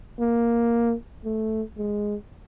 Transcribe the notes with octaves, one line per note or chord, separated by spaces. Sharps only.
A#3
A3
G#3